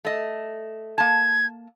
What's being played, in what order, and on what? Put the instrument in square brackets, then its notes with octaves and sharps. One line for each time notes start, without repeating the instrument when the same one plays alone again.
[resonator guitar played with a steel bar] A3 D#5
[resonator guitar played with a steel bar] A#3 A5 [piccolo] G#6